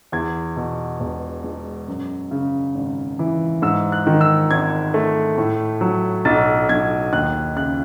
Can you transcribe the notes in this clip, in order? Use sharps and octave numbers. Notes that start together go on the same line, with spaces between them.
E2 G#6
B2
E1
G#3
F#2
C#3
G#1
E3
G#2 E6
F#6
D#3
E6
G#1 G#6
A3
A2
F#3
B1 A6
B1 G#6
D#2 F#6
C#3 F#6